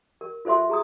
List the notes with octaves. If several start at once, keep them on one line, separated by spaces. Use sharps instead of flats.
A#4
F4 A4 C5 E5 C6
G#4 A#5 D#6